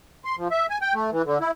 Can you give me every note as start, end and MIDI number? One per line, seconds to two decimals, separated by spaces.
0.25 0.36 84
0.37 0.48 53
0.51 0.66 76
0.70 0.78 80
0.81 0.94 79
0.94 1.10 57
1.12 1.22 52
1.25 1.38 50
1.41 1.51 64